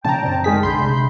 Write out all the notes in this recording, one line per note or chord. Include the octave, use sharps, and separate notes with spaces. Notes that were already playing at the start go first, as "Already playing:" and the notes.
A#2 C#3 F3 G5 A5 A#5
F#2 C4 D4
D#3 G#3 D#4 G#4 B6
B1 D3 D4 B5 C6 G6
C3 G#3